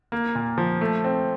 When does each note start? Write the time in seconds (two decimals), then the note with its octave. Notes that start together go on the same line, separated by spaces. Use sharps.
0.12 A#3
0.35 A#2
0.58 F3
0.81 A3
1.04 C4